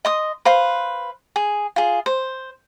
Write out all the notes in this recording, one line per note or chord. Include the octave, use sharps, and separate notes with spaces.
D#5 C6 D#6
B4 C5 F5
G#4
F4 G#4
C5